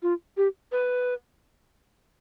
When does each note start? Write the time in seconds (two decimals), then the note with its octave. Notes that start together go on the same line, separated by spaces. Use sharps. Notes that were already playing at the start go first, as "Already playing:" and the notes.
0.03 F4
0.37 G4
0.72 B4